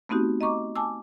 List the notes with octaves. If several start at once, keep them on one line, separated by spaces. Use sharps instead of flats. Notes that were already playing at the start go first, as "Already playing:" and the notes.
A3 B3 C4 D#4 F#4 G4
D#5 A#5 C#6 D6
G#5 A5 D6 E6